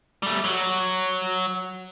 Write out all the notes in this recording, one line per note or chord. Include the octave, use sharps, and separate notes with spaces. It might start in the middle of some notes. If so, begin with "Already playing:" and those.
G3 A3
F#3 F#4